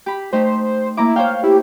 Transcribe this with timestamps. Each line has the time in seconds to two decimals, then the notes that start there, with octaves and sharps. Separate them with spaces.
0.06 G4 B5
0.33 A3 D#4 G4 C5
0.97 A#3 E4 A#5 D6
1.16 C5 C#5 F5 G5
1.43 E4 G4